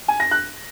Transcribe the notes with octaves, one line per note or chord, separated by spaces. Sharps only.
G#5
A#6
F#6